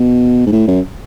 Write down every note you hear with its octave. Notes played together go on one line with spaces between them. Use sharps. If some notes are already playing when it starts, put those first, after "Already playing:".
Already playing: B2
G#2
A2
F#2